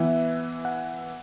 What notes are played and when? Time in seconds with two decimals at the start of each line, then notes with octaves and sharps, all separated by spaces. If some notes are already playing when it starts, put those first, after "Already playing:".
Already playing: E3 B3 E4 E5
0.65 F#5